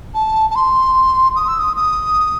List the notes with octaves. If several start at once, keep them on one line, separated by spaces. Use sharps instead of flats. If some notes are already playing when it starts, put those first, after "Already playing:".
A5
A5
C6
D#6
E6
D#6
D#6